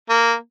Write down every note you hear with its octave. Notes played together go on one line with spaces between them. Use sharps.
A#3